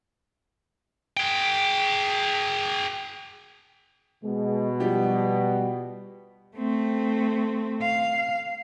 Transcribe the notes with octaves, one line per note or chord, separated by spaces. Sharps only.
G#4 G5
B2 G#3
F3 G3 G4
A3 C4
F5